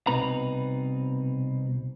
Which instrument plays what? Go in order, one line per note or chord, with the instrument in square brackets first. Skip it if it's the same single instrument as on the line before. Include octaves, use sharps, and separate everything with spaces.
[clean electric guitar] C2 B2 C4 D#4 B4 A#5